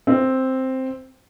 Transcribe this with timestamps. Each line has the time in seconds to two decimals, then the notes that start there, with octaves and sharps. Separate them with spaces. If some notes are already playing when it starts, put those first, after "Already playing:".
0.07 C4